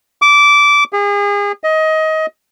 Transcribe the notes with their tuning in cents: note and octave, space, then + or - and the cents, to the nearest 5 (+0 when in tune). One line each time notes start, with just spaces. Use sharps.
D6 -15
G#4 -35
D#5 +20